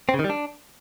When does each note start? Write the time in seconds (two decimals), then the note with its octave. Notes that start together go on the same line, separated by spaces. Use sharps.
0.09 C4
0.14 C#3
0.19 D#3
0.24 G3
0.30 D4